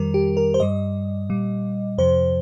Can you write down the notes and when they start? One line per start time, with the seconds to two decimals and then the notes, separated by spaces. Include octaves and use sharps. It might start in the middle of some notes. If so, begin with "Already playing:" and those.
Already playing: F2 D#3 G3 A#4
0.14 G4
0.37 A#4
0.54 C5
0.60 G2 G3 D#5
1.29 A#2 G3
1.98 F2 C3 F3 C5